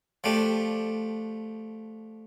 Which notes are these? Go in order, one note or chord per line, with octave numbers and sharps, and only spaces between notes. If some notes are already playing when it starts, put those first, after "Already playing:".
F3 A3 D4 G4